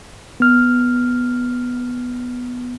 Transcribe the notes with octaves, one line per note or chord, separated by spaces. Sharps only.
B3 F6